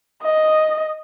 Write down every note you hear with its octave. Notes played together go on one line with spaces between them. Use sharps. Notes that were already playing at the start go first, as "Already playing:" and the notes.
D#5